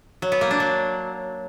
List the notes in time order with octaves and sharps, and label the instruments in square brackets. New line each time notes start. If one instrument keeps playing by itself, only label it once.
[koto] F#3
B3
A#3
D4
F#3